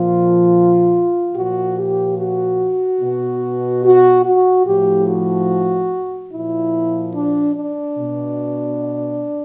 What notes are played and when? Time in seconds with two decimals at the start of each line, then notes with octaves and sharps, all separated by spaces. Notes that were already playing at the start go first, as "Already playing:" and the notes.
Already playing: A#2 F3 F4
1.35 A#2 F3 F#4
1.78 G4
2.19 F#4
3.01 B2
3.84 F#4
4.25 F#4
4.66 A2 F3 G4
5.08 F#4
6.32 A#2 F3 E4
7.14 D4
7.55 D4
7.97 B2